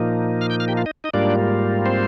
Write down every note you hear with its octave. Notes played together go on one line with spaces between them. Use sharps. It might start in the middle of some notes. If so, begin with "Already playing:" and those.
Already playing: A#2 F3 A#3 D#4
F5 F6
G5 G6
F5 F6
G4 G5
F4 F5
D#4 D#5
D#4 D#5
G#2 G3 A#3 D4 F4 D5
C4 C5